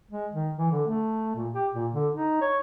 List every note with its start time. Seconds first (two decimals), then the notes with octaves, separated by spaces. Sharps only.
0.11 G#3
0.33 D#3
0.58 E3
0.71 D3
0.88 A3
1.35 A#2
1.54 G4
1.74 A#2
1.92 D3
2.14 D#4
2.41 C#5